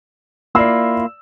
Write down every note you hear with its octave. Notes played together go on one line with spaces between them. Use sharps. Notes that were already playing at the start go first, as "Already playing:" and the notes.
A#3 E4 F4 D5 E6